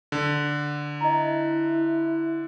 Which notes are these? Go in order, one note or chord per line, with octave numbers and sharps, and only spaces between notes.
D3
E4 D#5 A#5